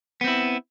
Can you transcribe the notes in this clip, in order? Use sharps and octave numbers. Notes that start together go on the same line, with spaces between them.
B3 C4 E4